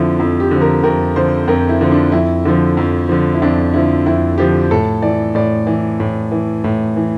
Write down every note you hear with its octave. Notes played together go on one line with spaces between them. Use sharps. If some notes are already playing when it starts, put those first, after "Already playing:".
Already playing: F2 D3 F3 E4 F4
F2
G4
D3 F3
A#4
F2 A#4
D3 F3 C5
F2 A#4
E4
D3 F3
D4
F2 E4
D3 F3
F2
D3 F3
E4
F2 D4
D3 F3 E4
F2 E4
D3 F3 G4
A2 A4
E3 D5
A2 D5
E3
A2
E3
A2
E3